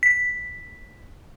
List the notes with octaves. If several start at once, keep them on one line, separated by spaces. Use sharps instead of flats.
B6